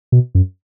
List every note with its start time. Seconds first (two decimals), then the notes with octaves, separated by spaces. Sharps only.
0.12 B2
0.35 F#2